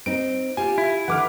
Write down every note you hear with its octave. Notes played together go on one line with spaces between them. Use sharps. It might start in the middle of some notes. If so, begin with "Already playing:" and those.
C4 D#4 D7
F4 G4 G#5
E4
D3 E3 F#5 D6 F6